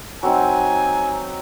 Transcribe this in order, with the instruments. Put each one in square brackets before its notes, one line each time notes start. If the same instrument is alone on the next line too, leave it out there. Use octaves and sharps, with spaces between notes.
[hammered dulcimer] F#3 C4 D#4 [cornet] G#5